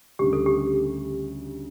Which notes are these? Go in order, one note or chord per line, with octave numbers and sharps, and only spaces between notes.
D2 C#3 G3 G4
A4
G4